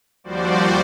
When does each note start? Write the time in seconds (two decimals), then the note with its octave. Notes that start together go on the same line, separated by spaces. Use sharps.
0.24 D#2 F3 G3 F#4 C5 D5